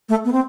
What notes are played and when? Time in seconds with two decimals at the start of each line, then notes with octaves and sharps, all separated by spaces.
0.09 A3
0.25 B3
0.32 C4